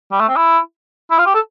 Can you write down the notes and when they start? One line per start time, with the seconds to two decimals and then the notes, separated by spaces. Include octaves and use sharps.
0.12 G3
0.20 A3
0.29 C4
0.36 E4
1.11 E4
1.18 F4
1.26 G4
1.35 A4